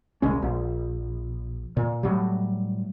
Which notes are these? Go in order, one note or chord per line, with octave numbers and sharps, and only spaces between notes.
D#1 C2 G#3 C#4
A#1
A#2
A2 F#3 G3